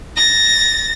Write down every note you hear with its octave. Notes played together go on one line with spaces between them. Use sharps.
A6 A#6